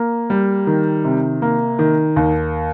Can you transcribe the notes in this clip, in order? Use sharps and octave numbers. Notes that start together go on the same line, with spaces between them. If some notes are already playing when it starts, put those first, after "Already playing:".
Already playing: A#3
G3
D#3
C3
A#3
D#3
D#2